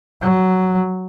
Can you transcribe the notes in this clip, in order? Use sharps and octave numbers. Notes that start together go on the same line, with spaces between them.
F#3